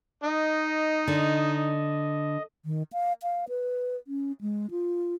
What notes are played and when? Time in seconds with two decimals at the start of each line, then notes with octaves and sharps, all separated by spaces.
0.24 D#4 D#5
1.08 D3
2.65 D#3
2.93 F5
3.23 F5
3.49 B4
4.07 C#4
4.41 G#3
4.71 F4